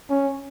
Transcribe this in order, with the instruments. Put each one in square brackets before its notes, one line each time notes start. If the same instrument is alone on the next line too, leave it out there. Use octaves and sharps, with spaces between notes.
[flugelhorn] C#4